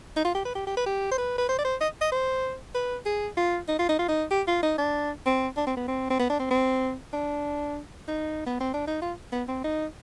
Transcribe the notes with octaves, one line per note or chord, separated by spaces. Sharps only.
D#4
F4
G4
B4
G4
G4
B4
G4
C5
B4
B4
C5
D5
C5
D#5
D#5
C5
B4
G#4
F4
D#4
F4
D#4
F4
D#4
G4
F4
D#4
D4
C4
D4
C4
B3
C4
C4
B3
D4
C4
C4
D4
D#4
B3
C4
D4
D#4
F4
B3
C4
D#4